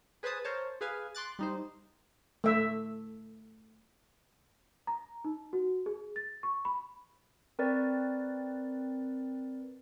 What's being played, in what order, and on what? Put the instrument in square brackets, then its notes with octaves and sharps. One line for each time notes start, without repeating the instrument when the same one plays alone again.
[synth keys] G#4 B4 C5 G#5 A5 D#6
A#4 C5 C#5 A5
G#4 B4 F5 G#5
C6 D6 F#6 A6
G3 D#4 C5
[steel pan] A3 E5
[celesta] A#5
D#4
F#4
G#4
A6
C#6
B5
[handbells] C4 A#4 B4 D5 A6